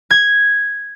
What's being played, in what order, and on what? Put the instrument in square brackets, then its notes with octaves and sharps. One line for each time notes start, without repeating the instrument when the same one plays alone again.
[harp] G#6